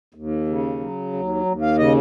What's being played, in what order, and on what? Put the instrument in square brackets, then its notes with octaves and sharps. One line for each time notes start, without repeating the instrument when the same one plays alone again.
[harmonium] D#2
C#3
F#3
D#2
D#2
F5
C#3 D#5